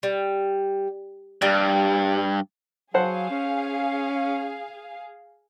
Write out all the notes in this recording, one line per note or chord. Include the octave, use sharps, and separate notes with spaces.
G3
G2 G3 A#3
F#3 G#4 C5 F5 F#5 A5
C#4